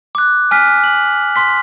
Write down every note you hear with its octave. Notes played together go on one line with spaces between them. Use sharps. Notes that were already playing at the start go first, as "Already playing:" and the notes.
D6 F#6
G#5 F6 B6
F#7
C6 B6